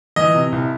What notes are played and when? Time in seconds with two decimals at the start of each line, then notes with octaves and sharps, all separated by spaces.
0.16 E3 D#5
0.35 C3
0.52 C2